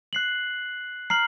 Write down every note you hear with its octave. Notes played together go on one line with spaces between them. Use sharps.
F#6 C7 F#7
A#5 F6 C7 F#7